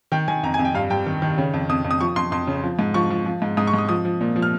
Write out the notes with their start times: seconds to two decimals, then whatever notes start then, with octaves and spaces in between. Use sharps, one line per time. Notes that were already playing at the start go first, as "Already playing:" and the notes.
0.12 D#3 G5
0.28 D#3 G#5
0.43 F2 A#5
0.54 G#5
0.59 F2
0.65 G5
0.75 G2 F5
0.90 G2 G5
1.06 D#3
1.22 D#3
1.38 C#3
1.54 F2
1.69 F2 D#6
1.85 F2
1.91 D#6
2.00 F3 C#6
2.16 F2 C6
2.32 F2 C6
2.47 C#3
2.63 F3
2.79 G#2
2.94 F3 C#6
3.10 F3
3.26 F3
3.42 G#2
3.57 G#2 D#6
3.67 C#6
3.74 G#2 D#6
3.89 F3 D#6
4.05 F3
4.21 A#2
4.36 F3
4.42 F6